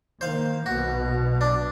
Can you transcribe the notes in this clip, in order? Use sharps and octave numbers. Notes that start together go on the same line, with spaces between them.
D#3 A#3 C5 F5
B1 B2 F#4
D4